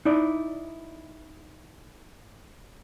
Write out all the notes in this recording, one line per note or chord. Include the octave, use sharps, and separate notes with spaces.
D#4 E4 D5